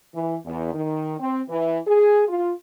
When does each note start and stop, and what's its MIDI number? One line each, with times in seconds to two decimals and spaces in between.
0.14 0.36 52
0.44 0.73 40
0.73 1.15 51
1.19 1.41 60
1.49 1.78 52
1.87 2.24 68
2.28 2.53 65